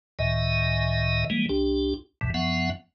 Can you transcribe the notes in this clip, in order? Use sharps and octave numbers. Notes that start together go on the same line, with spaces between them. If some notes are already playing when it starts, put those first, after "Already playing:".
C#2 A2 D#3 D#5 E5
E3 G3 G#3 A#3
C2 D4 G4
A1 D2 G2 B2 E3
F#2 F3 B3 E5 F#5